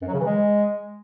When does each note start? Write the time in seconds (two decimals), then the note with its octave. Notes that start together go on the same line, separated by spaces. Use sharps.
0.01 F#2
0.08 F#3
0.14 C#3
0.20 E3
0.26 G#3